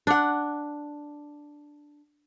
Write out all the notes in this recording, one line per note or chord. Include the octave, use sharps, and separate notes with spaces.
D4 F#5